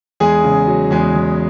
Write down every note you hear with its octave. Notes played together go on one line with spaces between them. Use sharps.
E2 G#3 G#4
C#3
F#3
E2 G#3 G#4
E2